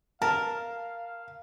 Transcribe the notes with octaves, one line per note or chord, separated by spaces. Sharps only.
A#4 F5 A5